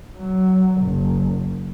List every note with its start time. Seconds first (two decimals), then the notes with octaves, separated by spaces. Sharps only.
0.17 F#3
0.82 F#1